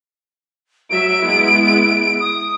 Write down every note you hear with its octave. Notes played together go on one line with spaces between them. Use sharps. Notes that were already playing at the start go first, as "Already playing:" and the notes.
F#3 E5 D7
G#3 B3 E4
D#6